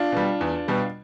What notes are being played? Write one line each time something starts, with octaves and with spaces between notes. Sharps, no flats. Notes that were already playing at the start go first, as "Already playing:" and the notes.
Already playing: D4 F4
B2 G3
E2
B2 G3